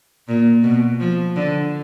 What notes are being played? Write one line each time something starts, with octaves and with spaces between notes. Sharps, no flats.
A#2
B2
F3
D3